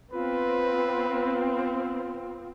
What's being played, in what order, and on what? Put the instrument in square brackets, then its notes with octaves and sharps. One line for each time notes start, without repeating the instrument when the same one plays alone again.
[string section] B3 C4 [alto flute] F4 [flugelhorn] B4